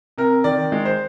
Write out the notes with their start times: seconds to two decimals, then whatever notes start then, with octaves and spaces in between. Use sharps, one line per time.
0.18 C3 A#4
0.44 D#3 D5
0.72 G#3
0.85 C5